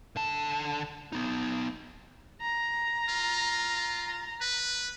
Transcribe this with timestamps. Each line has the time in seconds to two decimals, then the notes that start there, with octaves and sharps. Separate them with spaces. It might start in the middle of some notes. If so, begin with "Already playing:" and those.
0.16 D3 A5
1.12 B3 D#4
2.42 A#5
3.09 F4
4.41 B4